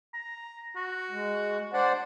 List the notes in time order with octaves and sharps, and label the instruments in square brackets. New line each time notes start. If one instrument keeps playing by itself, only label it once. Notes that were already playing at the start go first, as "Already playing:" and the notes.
[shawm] A#5
F#4
[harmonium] G#3
[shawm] D4 [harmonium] C5 D5 F#5